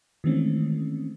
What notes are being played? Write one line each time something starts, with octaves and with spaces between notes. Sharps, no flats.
D#3 E3 G#3 A3 C4 C#4